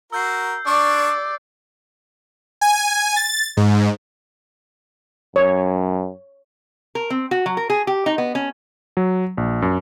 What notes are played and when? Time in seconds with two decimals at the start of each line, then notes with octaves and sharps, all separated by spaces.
0.12 F#4 A#4 E6 G6 C7
0.67 D4 D5 C#6
2.61 G#5
3.16 A6
3.57 G#2
5.36 F#2 C#5
6.95 A#4
7.10 C4
7.31 F#4
7.46 F#3
7.57 A#4
7.70 G#4
7.87 G4
8.06 D#4
8.18 B3
8.35 C#4
8.97 F#3
9.37 A#1
9.62 F#2